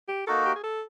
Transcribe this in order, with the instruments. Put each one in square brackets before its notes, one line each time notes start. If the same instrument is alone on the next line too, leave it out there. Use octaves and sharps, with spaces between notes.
[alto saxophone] G4
[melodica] A#3 D#4 F#4 A#4 [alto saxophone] A4
[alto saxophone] G4
G#4
A4